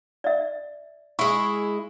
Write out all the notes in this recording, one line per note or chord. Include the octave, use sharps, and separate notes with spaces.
D5 E5
G#3 E4 C#6